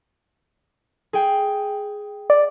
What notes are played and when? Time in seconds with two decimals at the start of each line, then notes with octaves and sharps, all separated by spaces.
1.13 G#4 G5
2.30 D5